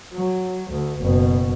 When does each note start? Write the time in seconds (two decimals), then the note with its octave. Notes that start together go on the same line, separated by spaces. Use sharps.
0.15 F#3
0.72 D2
1.01 F#1 B2